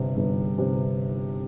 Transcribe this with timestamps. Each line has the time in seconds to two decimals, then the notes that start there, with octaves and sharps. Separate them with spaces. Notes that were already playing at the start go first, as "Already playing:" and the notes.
Already playing: G1 C3
0.17 G1
0.58 C3